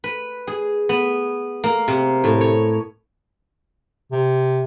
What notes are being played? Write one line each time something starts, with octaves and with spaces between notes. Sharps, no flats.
B4
G#4
B3
A#3
C3
A2
C#5
C3